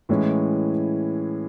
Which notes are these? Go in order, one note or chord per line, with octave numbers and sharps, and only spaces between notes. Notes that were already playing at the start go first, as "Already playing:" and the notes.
A2 E3 G#3 C#4